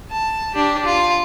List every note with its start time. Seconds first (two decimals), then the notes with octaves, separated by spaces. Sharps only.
0.11 A5
0.54 D4 G4
0.85 F4